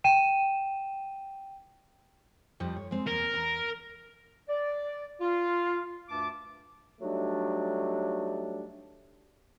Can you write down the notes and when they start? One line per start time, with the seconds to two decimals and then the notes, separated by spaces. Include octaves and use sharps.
0.04 G5 D#7 E7
2.60 F2 F3 G3
2.76 C#5
2.91 G#3 C4
3.07 E2 A#3 A#4
3.33 E2
4.49 D5
5.21 F4
6.09 D2 G2 A5 D6
7.01 F#3 G3 A3 D4 D#4